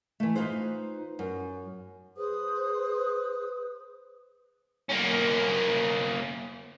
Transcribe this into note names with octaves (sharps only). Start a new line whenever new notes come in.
E3 A3
D#4 F4 B4 C5
F#2
G#4 B4 C5 D#6
A#3 C#4